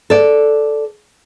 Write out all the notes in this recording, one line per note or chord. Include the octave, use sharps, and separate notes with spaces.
A4 D5